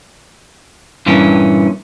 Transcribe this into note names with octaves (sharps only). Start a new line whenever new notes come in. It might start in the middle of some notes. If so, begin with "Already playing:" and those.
G2 A#2 E3 C#4